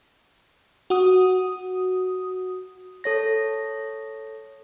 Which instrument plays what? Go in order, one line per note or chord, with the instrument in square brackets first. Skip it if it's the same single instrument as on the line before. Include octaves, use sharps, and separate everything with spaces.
[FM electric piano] F#4 D#6
[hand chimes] A4 C#5 A#6